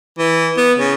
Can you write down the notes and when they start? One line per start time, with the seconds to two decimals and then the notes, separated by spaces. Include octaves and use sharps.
0.19 E3
0.57 B3
0.78 C#3